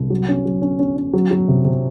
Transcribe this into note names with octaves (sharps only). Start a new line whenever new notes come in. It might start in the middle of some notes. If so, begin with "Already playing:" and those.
Already playing: C2
F#3
C#4
F#3
C#4
C#4
C#4
F#3
F#3
C3
C3